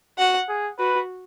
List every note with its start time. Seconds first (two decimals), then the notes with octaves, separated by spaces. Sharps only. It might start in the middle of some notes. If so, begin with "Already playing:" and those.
0.18 F#4 F#5
0.49 G#4
0.78 F#4 B4